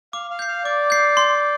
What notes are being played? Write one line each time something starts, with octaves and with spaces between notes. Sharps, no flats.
F5 D6
F5
G6 C7
F5
D5 D6
G6 C7
C6